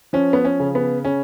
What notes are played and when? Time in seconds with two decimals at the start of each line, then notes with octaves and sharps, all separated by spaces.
0.13 F3 C#4
0.33 B3
0.45 C#4
0.60 C#3
0.75 B3
1.05 C#3 C#4